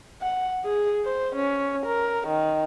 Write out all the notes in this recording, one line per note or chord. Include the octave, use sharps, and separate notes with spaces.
F#5
G#4
C5
C#4
A#4
D#3